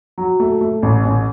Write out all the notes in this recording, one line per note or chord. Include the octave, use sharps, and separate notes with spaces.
F#3
A3
A3
A1
A1